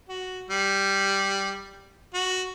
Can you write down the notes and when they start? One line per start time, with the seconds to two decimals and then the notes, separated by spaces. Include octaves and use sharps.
0.09 F#4
0.50 G3
2.14 F#4